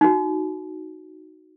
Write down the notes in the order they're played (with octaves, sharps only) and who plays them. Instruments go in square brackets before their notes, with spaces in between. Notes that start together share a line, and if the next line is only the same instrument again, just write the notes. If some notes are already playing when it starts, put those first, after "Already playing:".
[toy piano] D#4 F#4